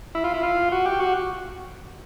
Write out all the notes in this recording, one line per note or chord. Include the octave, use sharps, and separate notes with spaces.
E4
F4
E4
F4
F#4
G4
F#4